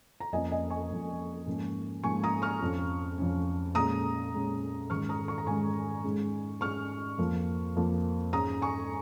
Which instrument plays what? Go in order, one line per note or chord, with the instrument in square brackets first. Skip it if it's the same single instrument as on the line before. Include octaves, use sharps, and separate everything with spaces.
[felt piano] A#5
F2 F3 A#3 C#4 D#5 G#5
D#5 G#5
G#5 C#6
F2 F3 A#3 C#4
G#2 F3 A#3 C#4
G#2 F3 A#3 C#4 G#5 C#6
A#5 D#6
C#6 F6
F2 F3 C#4
F2 F3 C#4
A#2 G#3 C#4 A#5 D#6
A#2 G#3 C#4
G#2 D#3 G#3 C#4 C#6 F6
A#5 D#6
C#6
A#5
G#2 D#3 G#3 C#4 G#5 C#6
G#2 G#3 C#4
G#2 G#3 C#4 C#6 F6
F2 F3 A#3
F2 F3 A#3
G#2 G#3 C#4 A#5 D#6
G#5 C#6